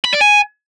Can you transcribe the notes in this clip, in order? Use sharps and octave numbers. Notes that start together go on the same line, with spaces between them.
B5
D5
G#5